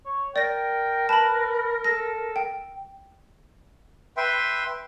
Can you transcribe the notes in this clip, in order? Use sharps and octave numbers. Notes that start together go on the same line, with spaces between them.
C#5
A#4 D5 G5 A#6
B4 A5 B5
A4 A#6
G5
B4 E5 G5 C6